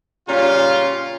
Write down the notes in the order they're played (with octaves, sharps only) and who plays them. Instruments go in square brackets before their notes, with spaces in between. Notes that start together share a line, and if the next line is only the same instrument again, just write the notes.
[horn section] A#2 C#3 G3 C#4 F4